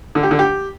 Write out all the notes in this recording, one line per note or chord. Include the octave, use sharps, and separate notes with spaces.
D3
G4
D3
G4